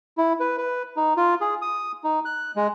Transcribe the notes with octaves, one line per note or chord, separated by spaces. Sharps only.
E4
B4
B4
D#4
F4
G#4
D#6
D#4
F#6
G#3